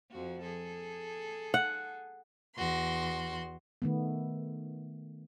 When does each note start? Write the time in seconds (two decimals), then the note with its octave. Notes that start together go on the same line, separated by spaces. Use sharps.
0.11 F2 F3 F#4
0.42 G#4 A4
1.54 F#5
2.55 E2 F#4 C6
3.82 D#3 A3 B3